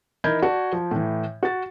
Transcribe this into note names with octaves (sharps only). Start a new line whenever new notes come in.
E3 D#4 A#4 B5 G6 G#6
F#4 D5 A5
F3
A2 E3
F#4 A6